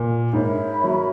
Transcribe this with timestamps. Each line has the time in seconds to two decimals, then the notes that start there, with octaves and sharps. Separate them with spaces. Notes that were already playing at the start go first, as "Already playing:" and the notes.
Already playing: A#2
0.33 G#2 A#4 C#5 E5 B5
0.84 F#3